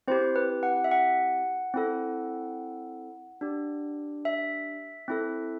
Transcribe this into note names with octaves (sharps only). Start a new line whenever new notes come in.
C4 E4 G4 C5
B4
F#5
E5
F#5
C4 E4 A4
D4 G4
E5
C4 E4 A4